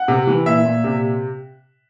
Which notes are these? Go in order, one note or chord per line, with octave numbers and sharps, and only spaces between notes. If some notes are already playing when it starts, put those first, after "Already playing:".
Already playing: F#5
C3
E3
A#2 E5
A#2
C3